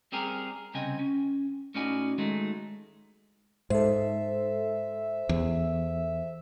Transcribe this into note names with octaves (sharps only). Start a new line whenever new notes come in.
G3 C4 G4 G#4 A#4
C2 C#3 C4 D#5 G5 G#5
C#4
A2 C#4 D#4 F#4 D5 G#5
D#3 F#3 G#3 A3 D#4
G#2 A4 C5 E5
E2